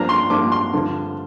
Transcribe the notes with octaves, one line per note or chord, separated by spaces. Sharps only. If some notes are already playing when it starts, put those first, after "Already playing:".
Already playing: G2 F3 A#3 D4 A#5
C6
G2 F3 A#3 D4 D6
C6
G2 D3 F3